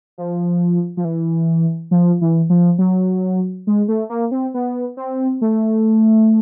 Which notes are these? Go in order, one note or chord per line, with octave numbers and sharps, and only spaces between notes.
F3
F3
E3
F3
E3
F3
F#3
G#3
A3
A#3
C4
B3
C4
A3